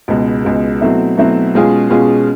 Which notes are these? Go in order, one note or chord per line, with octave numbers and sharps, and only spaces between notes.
C#2 B2 G#3
C#2 B2 G#3
B2 F#3 A3 C4 E4
B2 F#3 A3 C4 E4
B2 G#3 C#4 F4 G#4
B2 G#3 C#4 F4 G#4